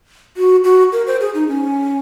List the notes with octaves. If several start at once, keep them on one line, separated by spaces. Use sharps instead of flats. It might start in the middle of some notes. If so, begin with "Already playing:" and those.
F#4
F#4
A#4
C5
G#4
D#4
C#4